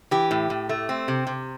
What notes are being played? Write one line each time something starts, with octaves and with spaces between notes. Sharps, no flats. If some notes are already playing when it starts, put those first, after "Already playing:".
E3 G4
A2
A2
A3
C4
C3
C3